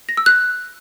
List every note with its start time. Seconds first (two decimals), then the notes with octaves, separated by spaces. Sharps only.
0.09 A#6
0.17 E6
0.26 F#6